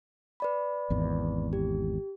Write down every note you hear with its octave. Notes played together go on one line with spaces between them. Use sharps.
B4 D5 B5
G#1 E2
G4